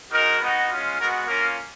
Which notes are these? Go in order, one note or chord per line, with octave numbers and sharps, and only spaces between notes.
G#3 D#4 F#4 A#4
B3 D#4 F#4
G#3 C#4 F4
G#3 B3 F#4 A#4
A#3 C#4 F4 A#4